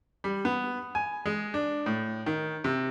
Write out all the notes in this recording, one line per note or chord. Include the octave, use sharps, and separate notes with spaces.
G3
B3
G#5
G#3
D4
A2
D#3
C3